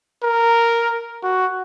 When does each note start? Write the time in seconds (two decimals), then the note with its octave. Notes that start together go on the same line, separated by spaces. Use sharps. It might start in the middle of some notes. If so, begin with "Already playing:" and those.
0.23 A#4
1.23 F#4